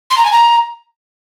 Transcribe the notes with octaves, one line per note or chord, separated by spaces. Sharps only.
C6
A#5
G#5
A#5